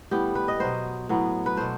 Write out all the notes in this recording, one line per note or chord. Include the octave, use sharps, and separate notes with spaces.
A2 G3 B3 G4
B4
D#5
B2 F#3 B3 C5
A2 F#3 B3
B4
B2 A3 C5